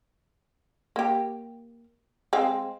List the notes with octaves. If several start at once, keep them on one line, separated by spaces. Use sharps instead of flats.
A#3 G4
G#3 C4 F5